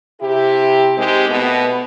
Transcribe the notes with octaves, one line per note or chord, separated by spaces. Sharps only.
C3 E4 G4
G#3 C4 D#4 G4 A#4
B2 A3 B3